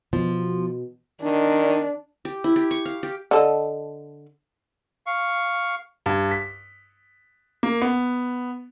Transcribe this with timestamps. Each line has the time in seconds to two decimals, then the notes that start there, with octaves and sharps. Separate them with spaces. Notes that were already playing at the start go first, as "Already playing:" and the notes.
0.13 B2 F3
1.23 D#3 D4
2.25 G4
2.44 E4
2.56 G4
2.71 C#6
2.85 F5
3.03 G4
3.31 D3 A4 D#5
5.06 F5 C#6
6.06 G2
6.31 B6
7.63 A#3
7.82 B3